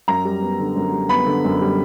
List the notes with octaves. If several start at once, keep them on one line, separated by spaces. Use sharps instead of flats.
F#2 A#5
G3
B3
D3
F#2
G3
B3 B5
D3
F#2
G3